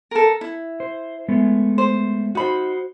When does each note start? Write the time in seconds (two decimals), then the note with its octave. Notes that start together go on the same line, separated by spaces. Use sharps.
0.11 A4 A#4
0.41 E4
0.80 C5
1.29 G#3 A3 B3
1.78 C5
2.35 D#4 F#4 C5 B5